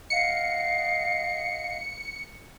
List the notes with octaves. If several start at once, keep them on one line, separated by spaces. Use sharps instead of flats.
D#5 F5 F#5 C#7